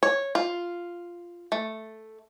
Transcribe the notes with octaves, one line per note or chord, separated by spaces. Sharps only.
C#5
F4
A3